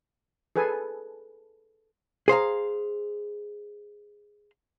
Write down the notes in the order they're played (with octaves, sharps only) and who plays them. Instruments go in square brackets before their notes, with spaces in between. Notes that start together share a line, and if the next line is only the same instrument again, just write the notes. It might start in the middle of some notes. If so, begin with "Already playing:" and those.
[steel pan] G#4 A4 B4 G#5
[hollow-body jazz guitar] G#4 C5 F5 A#5